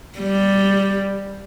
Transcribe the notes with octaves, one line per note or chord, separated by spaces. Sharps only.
G3